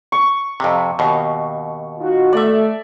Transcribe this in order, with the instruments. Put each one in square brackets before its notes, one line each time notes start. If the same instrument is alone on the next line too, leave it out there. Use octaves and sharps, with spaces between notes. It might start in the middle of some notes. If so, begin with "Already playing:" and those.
[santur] C#6
[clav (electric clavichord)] F2 C3
D#2 B2
[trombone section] D#4 F4 F#4
[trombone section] A3 [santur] D5 E5